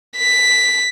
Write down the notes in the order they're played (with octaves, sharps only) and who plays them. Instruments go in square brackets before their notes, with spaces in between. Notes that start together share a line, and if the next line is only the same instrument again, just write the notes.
[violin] B6